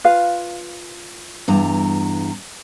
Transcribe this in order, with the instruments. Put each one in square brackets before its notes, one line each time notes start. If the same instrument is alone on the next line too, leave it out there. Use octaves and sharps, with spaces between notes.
[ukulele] F4 B4 F5
[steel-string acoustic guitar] E2 G2 A#5